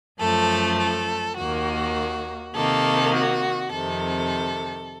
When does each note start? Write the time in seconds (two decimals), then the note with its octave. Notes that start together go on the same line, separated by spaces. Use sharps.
0.19 F#2 F3 A3 A4
0.79 A4
1.37 D#2 D#3 A#3 F#4
2.54 C3 D#3 A#3 A4
3.14 F#4
3.72 F2 C3 D#3 A4